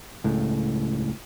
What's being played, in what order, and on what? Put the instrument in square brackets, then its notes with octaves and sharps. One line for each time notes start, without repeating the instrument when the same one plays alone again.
[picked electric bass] C#2 A2